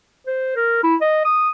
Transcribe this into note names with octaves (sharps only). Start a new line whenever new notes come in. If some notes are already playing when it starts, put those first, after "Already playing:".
C5
A#4
E4
D#5
D#6